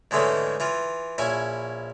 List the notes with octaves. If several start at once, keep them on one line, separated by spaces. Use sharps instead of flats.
G#2 D3 E3 G#3 A3 C#4
E3 F4
A#1 C#4 E4 G#5